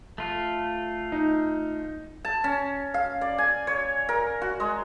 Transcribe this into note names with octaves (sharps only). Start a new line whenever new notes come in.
A3 F4
D#4
A5
C#4
F5
D5
G#5
C#5
A#4
F#4
G#3